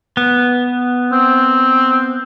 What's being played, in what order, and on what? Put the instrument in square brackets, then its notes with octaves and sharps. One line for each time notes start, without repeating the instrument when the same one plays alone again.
[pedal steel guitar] B3
[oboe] C4